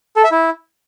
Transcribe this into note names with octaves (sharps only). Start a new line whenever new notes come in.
A4
E5
E4